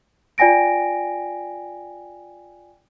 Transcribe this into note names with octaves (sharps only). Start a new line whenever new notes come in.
F4 D5 G5 G#5 A#6 D7